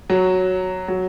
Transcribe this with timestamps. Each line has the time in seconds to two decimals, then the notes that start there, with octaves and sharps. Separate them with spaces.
0.10 F#3
0.88 F#3